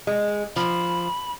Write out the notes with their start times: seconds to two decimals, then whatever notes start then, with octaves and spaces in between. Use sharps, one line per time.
0.07 G#3
0.56 F3 B5